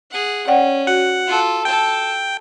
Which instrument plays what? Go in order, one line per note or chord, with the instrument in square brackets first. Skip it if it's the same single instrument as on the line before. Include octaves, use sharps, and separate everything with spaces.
[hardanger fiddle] G#4 F#5
[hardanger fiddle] C#4 [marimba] D5 F#5 G5
[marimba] F#4 [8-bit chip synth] F#5
[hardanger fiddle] F4 A4
[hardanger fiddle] A4 A5 [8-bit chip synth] G5